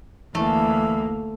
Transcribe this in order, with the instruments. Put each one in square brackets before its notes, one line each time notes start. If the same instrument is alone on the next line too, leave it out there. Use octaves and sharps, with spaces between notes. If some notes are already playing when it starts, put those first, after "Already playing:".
[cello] D2 A#3 [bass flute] E3 [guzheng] A3